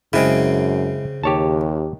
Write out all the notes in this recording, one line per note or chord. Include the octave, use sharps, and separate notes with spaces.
F#2 C#3 G#3 C4 E4
D#2 G4 C#5 A5